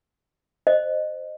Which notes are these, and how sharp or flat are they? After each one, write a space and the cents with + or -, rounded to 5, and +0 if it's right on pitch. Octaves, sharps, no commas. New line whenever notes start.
C5 +0 D#5 -25